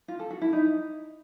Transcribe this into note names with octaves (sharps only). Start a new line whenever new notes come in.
F4
A4
F#4
E4
D#4